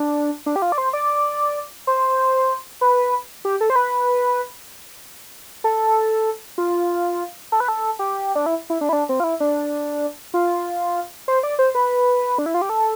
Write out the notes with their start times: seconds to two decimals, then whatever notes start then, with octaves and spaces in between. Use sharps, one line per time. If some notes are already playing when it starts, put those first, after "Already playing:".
Already playing: D4
0.46 D4
0.56 G4
0.62 F4
0.72 D5
0.78 C5
0.93 D5
1.87 C5
2.81 B4
3.45 G4
3.61 A4
3.70 C5
3.76 B4
5.64 A4
6.58 F4
7.52 A4
7.60 B4
7.68 A4
7.99 G4
8.35 D4
8.46 E4
8.70 E4
8.81 D4
8.89 E4
8.93 D4
9.09 C4
9.20 F4
9.24 E4
9.40 D4
10.34 F4
11.28 C5
11.43 D5
11.59 C5
11.75 B4
12.38 D4
12.46 E4
12.54 F4
12.62 G4
12.69 A4